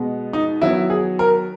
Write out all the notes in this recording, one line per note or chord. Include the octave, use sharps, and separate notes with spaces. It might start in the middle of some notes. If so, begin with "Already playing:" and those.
Already playing: B2 G#3 B3
D#4
D#3 F#3 B3 E4
G#4
A#4